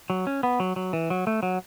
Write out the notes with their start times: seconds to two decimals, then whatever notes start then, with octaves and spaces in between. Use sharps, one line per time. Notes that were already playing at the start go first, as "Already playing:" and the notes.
0.10 F#3
0.27 C#4
0.43 B3
0.60 F#3
0.76 F#3
0.93 E3
1.10 F#3
1.27 A3
1.43 F#3